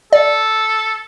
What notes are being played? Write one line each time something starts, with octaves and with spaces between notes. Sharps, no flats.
A4 D5